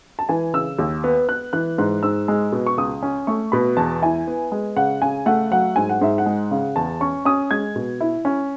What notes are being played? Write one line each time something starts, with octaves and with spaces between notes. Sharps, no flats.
A5
E3 G#5
C#3 E6
D#2
B3
B3 F#6
E3 F#6
G#2 F#6
G#2 E6
G#3
B2
C#6
C#2 D#6
C#4
A3 C#6
B2 B5
E2 A5
E4 G#5
B3
G#3
C#3 F#5
C#3 G#5
A3 F#5
F#3 F#5
G#2 G#5
F#5
G#2 E5
F#5
G#3
C#3
E2 A5
C#4 C#6
C#4 D#6
G#3 G#6
B2
E4
C#4